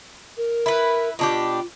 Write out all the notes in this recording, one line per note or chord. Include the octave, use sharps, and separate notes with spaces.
A#4
E4 B4
B2 D4 F4 G4